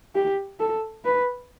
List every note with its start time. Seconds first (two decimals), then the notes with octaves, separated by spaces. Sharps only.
0.15 G4
0.60 A4
1.04 B4